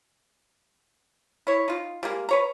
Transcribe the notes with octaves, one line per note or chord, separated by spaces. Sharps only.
E4 C#5
D#4 F4
G3 G#3 A#3
B4 C#5 A#5